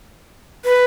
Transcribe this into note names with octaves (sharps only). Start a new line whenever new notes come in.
B4